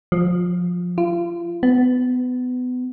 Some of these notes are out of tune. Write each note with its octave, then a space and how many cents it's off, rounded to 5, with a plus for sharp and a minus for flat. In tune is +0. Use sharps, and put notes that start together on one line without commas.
F3 +20
F4 -30
B3 +25